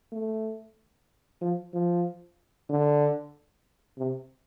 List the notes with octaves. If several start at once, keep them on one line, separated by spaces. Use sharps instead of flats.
A3
F3
F3
D3
C3